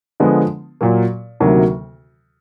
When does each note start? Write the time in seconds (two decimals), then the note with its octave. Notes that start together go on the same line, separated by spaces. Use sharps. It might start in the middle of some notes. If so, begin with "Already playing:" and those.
0.20 D3 F3 G#3 B3
0.81 A#2 F#3 A#3
1.40 D2 C3 D#3 F#3 A#3